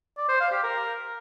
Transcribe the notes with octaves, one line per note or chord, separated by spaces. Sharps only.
D5
C5
F5
G4
A#4